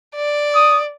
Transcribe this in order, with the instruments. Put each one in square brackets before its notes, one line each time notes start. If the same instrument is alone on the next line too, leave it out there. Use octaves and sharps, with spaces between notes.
[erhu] D5
[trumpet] D#6